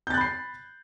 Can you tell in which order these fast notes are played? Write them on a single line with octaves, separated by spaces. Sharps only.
G6 A6 F#6 B5 C7